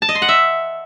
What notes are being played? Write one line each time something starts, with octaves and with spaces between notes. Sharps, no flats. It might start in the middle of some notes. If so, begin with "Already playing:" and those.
A5
D#5
C6
F#5
E5